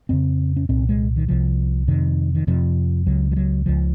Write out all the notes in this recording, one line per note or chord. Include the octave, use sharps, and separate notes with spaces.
F2 C#3 C4
C#4
C2 A#2 C4
G#3
D#3
C2 C3 F3
F2 C3 D#3
D#3
F2 C3 F3
C#2 C#3 F#3
F3
F#3
C#2 C#3 F3